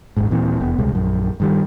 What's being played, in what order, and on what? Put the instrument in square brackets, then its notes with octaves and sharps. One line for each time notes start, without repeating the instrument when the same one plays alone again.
[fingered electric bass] D#1 G#1 G#2
D#1 A#2 E3 C4
F1 E2 B3
D#1 C2 B2 G#3
A#1 F#2
G2 D#3 G3